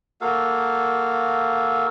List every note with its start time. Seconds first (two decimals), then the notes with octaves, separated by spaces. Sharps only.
0.21 A#3 F#4 A4 F5